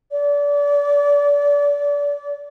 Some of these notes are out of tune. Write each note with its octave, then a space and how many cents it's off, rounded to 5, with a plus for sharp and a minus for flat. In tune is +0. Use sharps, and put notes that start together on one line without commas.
D5 -30